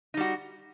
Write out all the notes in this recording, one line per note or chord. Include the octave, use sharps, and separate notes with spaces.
G3 D#4 F#4